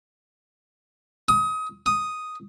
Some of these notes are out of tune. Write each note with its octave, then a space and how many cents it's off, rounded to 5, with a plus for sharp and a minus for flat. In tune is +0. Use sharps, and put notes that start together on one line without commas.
D#6 +25
D#6 +0